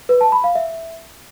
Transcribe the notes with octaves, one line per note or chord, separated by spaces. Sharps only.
B4
A5
B5
F5
E5